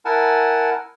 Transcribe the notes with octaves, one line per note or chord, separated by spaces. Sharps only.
E4 A#4 F#5 G#5 A5